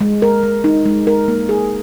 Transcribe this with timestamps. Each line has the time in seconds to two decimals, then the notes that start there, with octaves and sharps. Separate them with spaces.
0.01 G#3
0.22 A#4
0.43 G#3
0.64 D#4
0.86 G#3
1.07 A#4
1.28 A#3
1.49 G#4